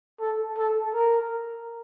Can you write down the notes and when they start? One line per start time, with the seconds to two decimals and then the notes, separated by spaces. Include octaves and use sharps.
0.21 A4
0.58 A4
0.94 A#4